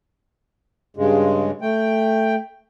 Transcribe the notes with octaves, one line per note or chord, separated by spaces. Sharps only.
G2 C#3 G#3
A3 G5